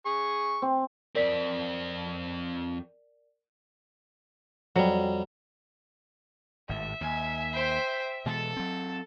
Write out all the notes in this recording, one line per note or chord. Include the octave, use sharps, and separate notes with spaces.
G#4 C#6
C4
F2 C4 A#4 D5 B6
F2 F#3 G3
G#1 A2 E5
D#2 G#5
C5 G5
B2 E3 G#3 A4 A5
F#3 C4